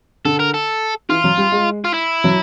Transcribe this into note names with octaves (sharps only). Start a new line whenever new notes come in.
D3 A4
A#4
A4
E3 F4
F#3
G3
G#3
F4
E4
F#3